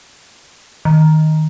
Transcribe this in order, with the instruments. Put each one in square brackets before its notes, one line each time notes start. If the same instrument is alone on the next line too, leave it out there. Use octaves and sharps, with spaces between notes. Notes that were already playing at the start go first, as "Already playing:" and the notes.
[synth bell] D#3